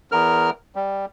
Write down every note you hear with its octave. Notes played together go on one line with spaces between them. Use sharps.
E2 A#4 F6
G3